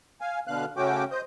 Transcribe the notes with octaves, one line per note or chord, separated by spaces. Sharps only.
F5 G#5
B2 D3 F5 F#6
C#3 A3 C#4 F#4 G5 D6
C5 D#5 G6